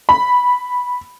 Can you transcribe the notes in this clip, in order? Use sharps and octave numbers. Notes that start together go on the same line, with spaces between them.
B5